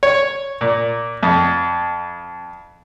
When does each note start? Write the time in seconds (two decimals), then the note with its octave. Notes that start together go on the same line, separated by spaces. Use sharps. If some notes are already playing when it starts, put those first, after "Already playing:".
0.03 C#5
0.61 A#2
1.23 F2